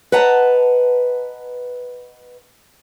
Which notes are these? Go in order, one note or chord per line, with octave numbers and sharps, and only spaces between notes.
B4 D#5 F#5 A5 A#5